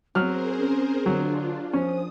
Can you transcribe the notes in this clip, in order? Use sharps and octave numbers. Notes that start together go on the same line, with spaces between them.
F#3 C4 G#4 A#4 C5 F6
C#4
D3 F#3 D4 F4
F3 C#4 C5 D#6